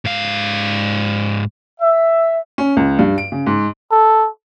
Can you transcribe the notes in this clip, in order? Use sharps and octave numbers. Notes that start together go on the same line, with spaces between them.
G#2 F5
E5
C#4
C#2
G2
D7
C#3
G#2
A4